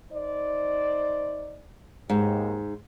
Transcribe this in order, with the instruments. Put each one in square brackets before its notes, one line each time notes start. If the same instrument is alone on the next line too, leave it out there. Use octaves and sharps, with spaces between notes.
[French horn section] D#4 C5 D5
[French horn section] D#2 [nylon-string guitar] G#2